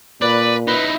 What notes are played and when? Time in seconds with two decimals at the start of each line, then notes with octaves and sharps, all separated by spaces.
0.22 A#2 B4 D5
0.68 D#4 E4 B4